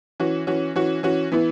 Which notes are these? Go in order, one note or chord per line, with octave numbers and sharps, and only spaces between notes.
E3 C#4 F#4
E3 C#4 F#4
E3 C#4 F#4
E3 C#4 F#4
E3 B3 E4